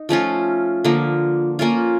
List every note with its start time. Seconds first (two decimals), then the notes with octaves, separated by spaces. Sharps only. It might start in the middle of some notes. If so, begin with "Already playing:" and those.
Already playing: D#4
0.09 F3 A3 C#4 F4
0.84 D3 F3 A#3
1.59 A#3 C#4 F4